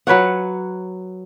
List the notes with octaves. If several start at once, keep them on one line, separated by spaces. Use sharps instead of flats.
F#3 B4 C#5 F#5